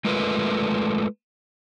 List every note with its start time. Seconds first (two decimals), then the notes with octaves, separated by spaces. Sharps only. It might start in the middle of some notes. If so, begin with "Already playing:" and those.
0.05 G#3 A3 F4 A#4 B4